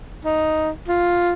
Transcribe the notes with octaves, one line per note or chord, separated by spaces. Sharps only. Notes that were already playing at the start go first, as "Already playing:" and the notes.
D#4
F4